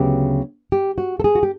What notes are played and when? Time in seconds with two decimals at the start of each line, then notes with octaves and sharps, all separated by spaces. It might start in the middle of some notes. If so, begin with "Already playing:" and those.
Already playing: D2 C#3 F#3 B3 G4
0.72 G4
0.98 F#4
1.20 A4
1.24 G#4
1.35 F#4
1.43 G4